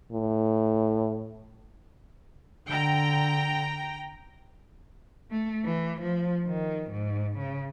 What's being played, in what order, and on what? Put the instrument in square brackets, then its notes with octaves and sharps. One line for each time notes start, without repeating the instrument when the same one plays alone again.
[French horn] A2
[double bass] D3 [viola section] G5 A#5
[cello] A3
E3
F3
D#3
G#2
C#3